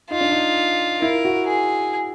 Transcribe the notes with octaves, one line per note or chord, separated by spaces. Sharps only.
D#4 F4
D4
D#4
E4 A#4
F#4
G#4